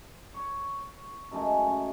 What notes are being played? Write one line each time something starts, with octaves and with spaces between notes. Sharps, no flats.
C#5
F#2 D#3 G#3 A3
F#2